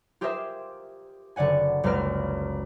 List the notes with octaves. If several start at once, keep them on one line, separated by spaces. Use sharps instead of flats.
F4 G4 G#4 A#4 C5 E5
F#1 D3 D5 F#5 G#5
F#1 C#2 A#3 B4 F6 D7